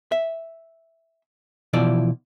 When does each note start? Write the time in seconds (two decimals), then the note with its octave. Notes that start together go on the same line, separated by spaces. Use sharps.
0.12 E5
1.73 B2 E3 F3 E4 D5